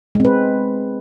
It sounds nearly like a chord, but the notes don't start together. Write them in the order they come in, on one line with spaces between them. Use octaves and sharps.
G#3 C4 B4